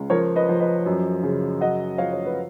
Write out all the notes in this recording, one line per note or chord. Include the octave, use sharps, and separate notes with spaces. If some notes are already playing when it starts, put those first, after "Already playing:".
Already playing: C#2
F3 A#4 C#5
B4 D#5
F3
B4 D#5
F#2
C#3
F#2 D#5 F#5
F3 C#5 F5
C#5
B4